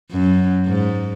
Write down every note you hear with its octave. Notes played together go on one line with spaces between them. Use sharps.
F#2
G#2